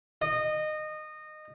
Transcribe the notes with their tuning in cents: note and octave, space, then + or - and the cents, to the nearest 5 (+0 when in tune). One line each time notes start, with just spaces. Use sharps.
D#5 -20